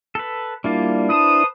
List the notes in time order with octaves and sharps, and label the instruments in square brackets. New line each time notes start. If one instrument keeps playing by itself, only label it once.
[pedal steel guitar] A4 B4
[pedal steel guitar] G3 A#3 F4 [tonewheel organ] D4 E4
[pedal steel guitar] B4 C5 A5 [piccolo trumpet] D#6